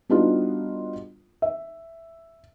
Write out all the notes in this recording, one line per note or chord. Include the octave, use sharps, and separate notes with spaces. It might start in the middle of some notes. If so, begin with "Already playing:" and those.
G3 B3 D4 D#4 F4 F#4
E5